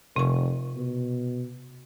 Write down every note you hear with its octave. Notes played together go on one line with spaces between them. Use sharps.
F1 C3 C#6
B2